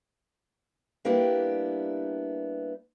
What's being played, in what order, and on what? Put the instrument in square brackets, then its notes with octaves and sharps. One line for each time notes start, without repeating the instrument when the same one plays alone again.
[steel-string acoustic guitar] G3 A#3 B3 D4 E4 G4